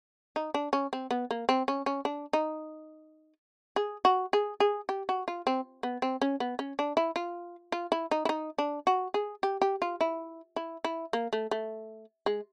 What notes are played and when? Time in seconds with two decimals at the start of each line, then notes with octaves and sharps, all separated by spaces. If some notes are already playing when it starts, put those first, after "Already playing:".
0.36 D#4
0.54 D4
0.73 C#4
0.93 C4
1.11 B3
1.31 A#3
1.49 C4
1.68 C#4
1.86 C#4
2.05 D4
2.33 D#4
3.76 G#4
4.05 F#4
4.33 G#4
4.60 G#4
4.89 G4
5.09 F#4
5.28 F4
5.47 C4
5.83 B3
6.02 C4
6.21 C#4
6.40 B3
6.59 C#4
6.79 D4
6.97 E4
7.16 F4
7.72 F4
7.92 E4
8.11 D#4
8.25 E4
8.29 D#4
8.58 D4
8.87 F#4
9.14 G#4
9.43 G4
9.62 G4
9.82 F4
10.01 E4
10.56 E4
10.84 E4
11.13 A#3
11.33 A3
11.51 A3
12.26 G#3